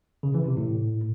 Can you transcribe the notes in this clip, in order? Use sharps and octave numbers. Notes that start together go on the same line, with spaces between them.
C#3
E3
C3
A2